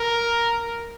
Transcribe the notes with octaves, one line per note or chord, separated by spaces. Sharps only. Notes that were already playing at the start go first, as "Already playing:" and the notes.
Already playing: A#4